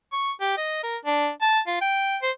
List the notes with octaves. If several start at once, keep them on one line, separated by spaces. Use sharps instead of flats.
C#6
G4
D#5
A#4
D4
A5
F4
G5
C5